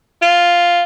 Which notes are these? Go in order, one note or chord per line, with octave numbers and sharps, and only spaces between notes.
F4